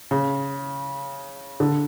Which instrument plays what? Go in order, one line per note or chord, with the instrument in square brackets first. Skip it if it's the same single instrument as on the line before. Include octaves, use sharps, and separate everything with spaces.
[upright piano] C#3
D3